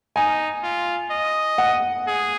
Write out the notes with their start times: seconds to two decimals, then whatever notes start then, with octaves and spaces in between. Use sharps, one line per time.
0.16 D#4 G#5
0.63 F4
1.11 D#5
1.58 F#5
2.07 G#4